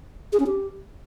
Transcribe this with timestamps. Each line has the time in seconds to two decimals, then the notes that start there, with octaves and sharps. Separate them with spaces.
0.33 G#4
0.40 C#4
0.47 G4